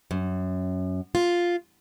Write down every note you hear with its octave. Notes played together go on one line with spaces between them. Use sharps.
F#2
F4